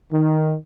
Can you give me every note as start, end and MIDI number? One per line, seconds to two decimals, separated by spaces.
0.12 0.55 51